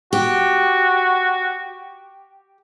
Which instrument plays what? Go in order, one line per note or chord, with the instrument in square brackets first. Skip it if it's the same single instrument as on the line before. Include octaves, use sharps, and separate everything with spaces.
[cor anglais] F#4 [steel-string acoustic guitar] G4